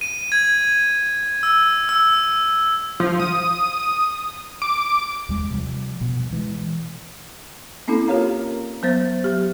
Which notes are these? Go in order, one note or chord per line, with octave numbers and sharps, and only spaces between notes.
D#7
G#6
E6
E6
F3
D#6
D6
D#2 G3 G#3
C3 F3 G3
B2
B2 E3 G3 G#3
A#3 C4 C#4 E4 A4
F4 G4 A#4 C#5 F5 A#5
F#3 B3 C5 A6
F#3 G4